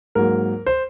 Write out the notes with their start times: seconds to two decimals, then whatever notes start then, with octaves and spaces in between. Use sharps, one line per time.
0.15 G#2 F#3 A#3 A#4
0.66 C5